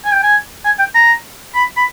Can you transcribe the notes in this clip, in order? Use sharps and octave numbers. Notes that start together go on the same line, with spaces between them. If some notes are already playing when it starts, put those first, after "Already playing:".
G#5
G5
G#5
G#5
G5
A#5
B5
B5